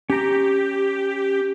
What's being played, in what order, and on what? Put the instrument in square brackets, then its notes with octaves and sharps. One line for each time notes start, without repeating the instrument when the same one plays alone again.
[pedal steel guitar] C#4 A#5 [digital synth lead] G4